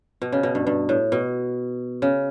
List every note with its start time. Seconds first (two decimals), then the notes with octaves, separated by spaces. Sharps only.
0.22 B2
0.32 C#3
0.43 B2
0.55 G2
0.67 G2
0.89 A2
1.12 B2
2.02 C#3